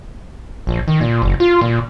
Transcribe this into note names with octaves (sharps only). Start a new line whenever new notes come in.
A#1
D#3
A#2
F#1
F4
A#2